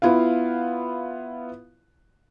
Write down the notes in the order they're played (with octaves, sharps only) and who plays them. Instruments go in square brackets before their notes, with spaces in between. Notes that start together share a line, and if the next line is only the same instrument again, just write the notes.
[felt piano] B3 E4 F4 F5